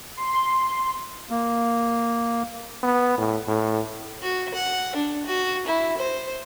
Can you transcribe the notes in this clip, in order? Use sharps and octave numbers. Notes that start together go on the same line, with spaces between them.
C6
A#3
B3
A2
A2
F#4
F#5
D4
F#4
E4
C5